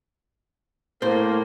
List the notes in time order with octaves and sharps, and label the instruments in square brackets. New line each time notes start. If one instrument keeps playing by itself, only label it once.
[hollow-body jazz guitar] A2 C5 [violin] A#3